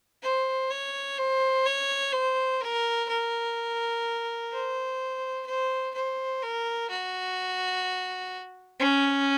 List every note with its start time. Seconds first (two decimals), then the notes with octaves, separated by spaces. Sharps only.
0.23 C5
0.70 C#5
1.18 C5
1.66 C#5
2.13 C5
2.61 A#4
3.09 A#4
4.51 C5
5.46 C5
5.94 C5
6.42 A#4
6.90 F#4
8.80 C#4